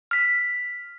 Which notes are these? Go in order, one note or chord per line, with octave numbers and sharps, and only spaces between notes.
F6 B6